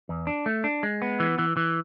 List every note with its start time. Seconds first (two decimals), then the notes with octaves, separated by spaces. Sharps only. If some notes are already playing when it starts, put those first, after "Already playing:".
0.09 E2
0.27 D4
0.46 A3
0.64 D4
0.83 G#3
1.02 B3
1.20 E3
1.39 E3
1.57 E3